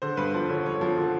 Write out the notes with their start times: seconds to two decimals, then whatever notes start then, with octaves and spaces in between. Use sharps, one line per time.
0.02 D3 C5
0.17 G2 B4
0.34 F3 C5
0.50 D3 C#5
0.66 G2 C#5
0.81 F3
0.98 D3